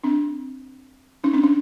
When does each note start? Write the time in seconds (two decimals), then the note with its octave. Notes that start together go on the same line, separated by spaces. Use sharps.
0.04 C4 D4
1.24 C#4 D#4
1.33 C4 D4
1.44 C#4